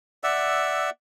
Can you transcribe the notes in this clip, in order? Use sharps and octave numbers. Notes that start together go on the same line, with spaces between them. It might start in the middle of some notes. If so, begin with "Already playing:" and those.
D5 E5 F#5 E6